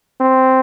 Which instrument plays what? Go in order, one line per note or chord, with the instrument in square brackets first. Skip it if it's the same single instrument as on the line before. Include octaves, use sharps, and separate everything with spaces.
[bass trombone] C4